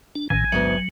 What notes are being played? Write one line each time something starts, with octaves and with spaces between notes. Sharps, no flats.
D4
A1 A2 D#3 G#5
D2 G#2 F#3 B3